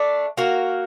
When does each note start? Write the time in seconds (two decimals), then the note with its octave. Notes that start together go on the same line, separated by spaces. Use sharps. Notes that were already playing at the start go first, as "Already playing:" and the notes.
Already playing: A3 D4
0.37 A#3 F#4 A#4